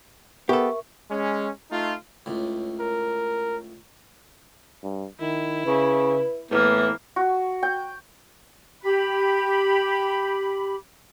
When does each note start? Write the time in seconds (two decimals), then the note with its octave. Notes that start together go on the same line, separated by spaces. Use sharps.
0.49 B3 G4 A4 A#4 E5 C#6
1.10 G#3 C#4
1.71 A3 D#4 F4
2.26 C#2 A2
2.80 A#4
4.84 G2
5.20 D#3 E4
5.66 C#3 B4
6.51 A2 E3 A#3 B3
7.16 F#4
7.63 G5
8.82 G4 B5